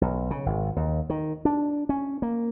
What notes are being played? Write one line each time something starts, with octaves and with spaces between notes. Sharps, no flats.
B1
C#3
G#1
D#2
D#3
D4
C#4
A#3